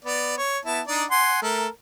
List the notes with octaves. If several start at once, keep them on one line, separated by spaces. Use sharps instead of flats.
B3 D5
C#5
B3 E4 A5
D4 D#4 D5
F#5 G#5 C6
A3 A4 A#4